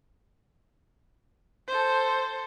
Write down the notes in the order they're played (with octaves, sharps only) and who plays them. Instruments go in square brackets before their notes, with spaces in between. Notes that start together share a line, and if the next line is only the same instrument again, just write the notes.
[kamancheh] A4 C5